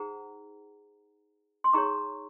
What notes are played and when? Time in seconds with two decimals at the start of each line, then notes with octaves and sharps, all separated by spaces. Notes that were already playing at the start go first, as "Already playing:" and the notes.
Already playing: D#4 G#4 C5 F#5 A#5
1.64 C6
1.73 D#4 G#4 C#5 A#5 C#6